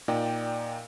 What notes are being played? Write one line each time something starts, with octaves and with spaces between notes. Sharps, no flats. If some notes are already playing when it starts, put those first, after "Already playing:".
A#2 D#4 D5 G5